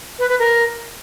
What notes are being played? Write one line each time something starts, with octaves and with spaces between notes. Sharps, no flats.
B4
B4
A#4